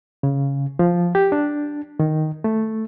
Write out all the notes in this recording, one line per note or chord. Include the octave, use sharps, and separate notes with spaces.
C#3
F3
G4
D4
D#3
A3